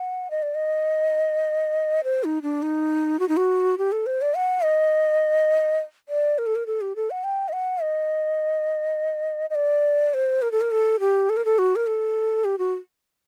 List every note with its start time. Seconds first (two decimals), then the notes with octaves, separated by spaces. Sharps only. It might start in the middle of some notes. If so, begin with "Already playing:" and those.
Already playing: F#5
0.31 D#5
0.43 D5
0.55 D#5
2.04 C5
2.24 D#4
2.42 D4
2.62 D#4
3.19 F#4
3.29 D#4
3.37 F#4
3.78 G4
3.92 A4
4.06 C5
4.22 D5
4.36 F#5
4.64 D#5
6.09 D5
6.38 A#4
6.46 A4
6.56 A#4
6.66 A4
6.81 G4
6.96 A4
7.11 F#5
7.24 G5
7.49 D#5
7.53 F#5
7.82 D#5
9.50 D#5
9.55 D5
10.14 C5
10.42 A#4
10.52 A4
10.61 A#4
10.71 A4
11.00 G4
11.30 A4
11.37 A#4
11.45 A4
11.59 F#4
11.76 A#4
11.87 A4
12.45 G4
12.58 F#4